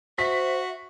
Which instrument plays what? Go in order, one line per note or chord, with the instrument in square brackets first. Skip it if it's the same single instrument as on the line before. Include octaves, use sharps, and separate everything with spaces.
[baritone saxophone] F#4 [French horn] C5 [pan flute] E5 [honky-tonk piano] B6